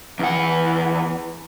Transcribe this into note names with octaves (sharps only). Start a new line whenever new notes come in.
E2 F#5